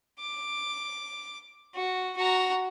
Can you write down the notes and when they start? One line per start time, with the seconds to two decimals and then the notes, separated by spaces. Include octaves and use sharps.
0.20 D6
1.75 F#4
2.17 F#4 A#5